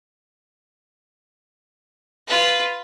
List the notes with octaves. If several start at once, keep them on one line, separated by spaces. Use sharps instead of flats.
F4 B4